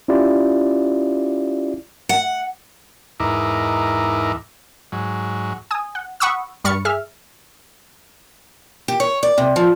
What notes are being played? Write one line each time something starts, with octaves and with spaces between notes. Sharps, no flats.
C#4 E4 F4 G4 D5
F#5
E2 G#2 D#4 E4 A#4 D6
G#2 F#3
G#5 D#6
F#5
F#5 B5 C#6 D#6 E6
G2 B5 C#6 F6 A6 C#7
G#4 E5 F6
G4
C#5
D5
C3
F3